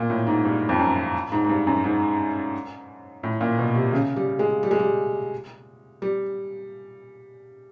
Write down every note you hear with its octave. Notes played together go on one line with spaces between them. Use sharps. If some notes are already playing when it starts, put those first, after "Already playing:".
Already playing: A#2
A2
G#2
G2
F2
F#2
G#2
G#2
G2
F#2
G#2
A2
A#2
B2
C3
C#3
G3
G#3
G3
G#3
G3
G3